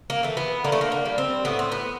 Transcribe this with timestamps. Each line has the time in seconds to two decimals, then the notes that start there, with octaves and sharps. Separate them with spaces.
0.10 A#3
0.23 E3 A3
0.37 B3
0.64 D3 A#3
0.72 A3
0.81 A#3
0.92 A#3
1.05 G3
1.18 C4
1.45 A2 B3
1.59 C4
1.72 B3